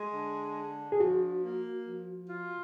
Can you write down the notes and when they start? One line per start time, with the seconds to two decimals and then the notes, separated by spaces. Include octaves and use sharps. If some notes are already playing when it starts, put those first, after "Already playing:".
Already playing: G#3
0.14 D3
0.57 D4
0.92 G#4
1.00 F3 F#4
1.43 A#3
1.86 F3
2.29 F4